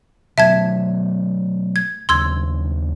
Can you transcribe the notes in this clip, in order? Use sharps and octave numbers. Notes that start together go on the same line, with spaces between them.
B2 F#3 A3 E5 A5 G#6
G#6
D#2 C#3 F#3 C6 E6 G#6